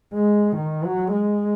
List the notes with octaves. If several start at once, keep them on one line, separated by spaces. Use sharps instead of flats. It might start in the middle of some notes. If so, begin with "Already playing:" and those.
G#3
D#3
F#3
G#3